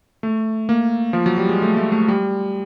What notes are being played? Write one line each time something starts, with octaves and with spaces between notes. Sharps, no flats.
A3
A#3
F3
F#3
G3
G#3
A3
A3
A3
G3